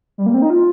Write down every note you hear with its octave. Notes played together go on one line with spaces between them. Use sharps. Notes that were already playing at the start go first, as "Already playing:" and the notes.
G3
A#3
C4
D#4
F4